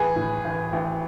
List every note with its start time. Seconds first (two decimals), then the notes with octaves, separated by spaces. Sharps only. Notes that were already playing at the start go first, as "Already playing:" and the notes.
Already playing: A1 G#4 B4
0.16 A2
0.45 A1
0.73 A1